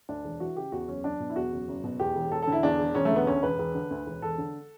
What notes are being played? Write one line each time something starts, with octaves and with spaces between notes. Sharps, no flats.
D2 D4
E1
E3 F#4
C#3 G4
E2 F#4
F#1 C#4
F#1 D4
B2
E4
E2 F#4
F#1
F#1
B2
E2 G4
E1
E1 A4
A4
D3 E4
E2 D4
E1
E1 C#4
A3
D3
B3
D2 C#4
E1 B4
E1
D3
D2
E1
E1 A4
D3